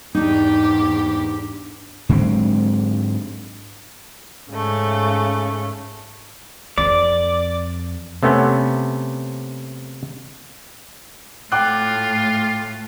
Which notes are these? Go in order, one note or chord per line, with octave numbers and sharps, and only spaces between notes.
E2 G#2 D4 D#4 G4
G#2 D3 F#3 C4
G#2 C#3 A3
F2 D5
C3 A3 B3 C#4
A2 A3 F4 G5 D6 F#6